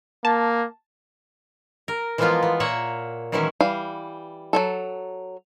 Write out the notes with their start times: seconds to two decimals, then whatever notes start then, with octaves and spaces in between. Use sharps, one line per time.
0.25 A#3 A5
1.88 A#4
2.18 E3 F3 G#3 A#3 B3 F4
2.43 B3
2.60 A#2 A#3 C#5 E5 F#5
3.32 D#3 E3 F#3 G#3 C#4 E4
3.61 E3 G3 F5
4.53 F#3 G#3 A4